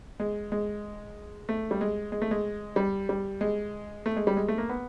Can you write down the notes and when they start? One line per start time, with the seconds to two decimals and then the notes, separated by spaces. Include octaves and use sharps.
0.20 G#3
0.52 G#3
1.49 A3
1.71 G3
1.81 G#3
2.12 G#3
2.22 A3
2.31 G#3
2.76 G3
3.09 G3
3.41 G#3
4.06 A3
4.16 G#3
4.27 G3
4.37 G#3
4.48 A3
4.58 A#3
4.69 B3